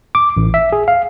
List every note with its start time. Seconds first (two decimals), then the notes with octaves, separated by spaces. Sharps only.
0.15 D6
0.37 A1
0.54 E5
0.72 G#4
0.88 F5